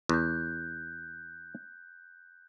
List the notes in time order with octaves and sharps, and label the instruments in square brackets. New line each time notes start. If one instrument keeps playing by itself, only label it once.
[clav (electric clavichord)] E2 [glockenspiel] F#6 G6